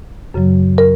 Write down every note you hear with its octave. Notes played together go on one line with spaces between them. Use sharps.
F#2 C#3 F#3
A#4